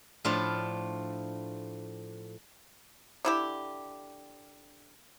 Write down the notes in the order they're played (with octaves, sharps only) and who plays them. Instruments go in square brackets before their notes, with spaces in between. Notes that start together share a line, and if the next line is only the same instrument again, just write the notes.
[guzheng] A2 F3 A3 D4 F4
[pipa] D3 E4 G4